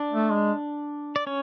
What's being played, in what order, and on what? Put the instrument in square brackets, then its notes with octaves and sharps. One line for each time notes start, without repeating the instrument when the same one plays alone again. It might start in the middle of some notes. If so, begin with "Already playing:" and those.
Already playing: [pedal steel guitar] D4 D5
[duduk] A3
G#3
[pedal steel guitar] D5
C#4 C#5